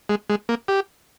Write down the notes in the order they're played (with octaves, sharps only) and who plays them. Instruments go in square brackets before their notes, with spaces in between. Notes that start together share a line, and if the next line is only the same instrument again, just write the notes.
[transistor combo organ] G#3
G#3
A#3
G4